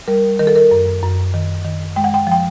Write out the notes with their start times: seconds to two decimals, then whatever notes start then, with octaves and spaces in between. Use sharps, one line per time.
0.08 G3 A#4
0.39 D#3 A#4
0.47 A4
0.56 A#4
0.71 F#2
1.03 F#2
1.34 D#3
1.65 D#3
1.96 G#3 G5
2.04 F#5
2.14 G5
2.27 F3 G5